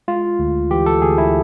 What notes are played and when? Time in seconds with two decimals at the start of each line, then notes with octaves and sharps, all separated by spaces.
0.08 G#3 F4
0.39 D2
0.71 E3 G4
0.86 A4
1.02 D2 G#4
1.18 E4